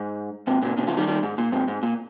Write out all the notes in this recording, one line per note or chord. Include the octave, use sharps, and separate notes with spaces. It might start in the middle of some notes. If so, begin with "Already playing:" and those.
Already playing: G#2
G#2 C3
A#2 C#3
A#2 C#3
C#3 F3
D#3 G3
D#3 G3
G#2
A#2
G#2 C3
G#2
A#2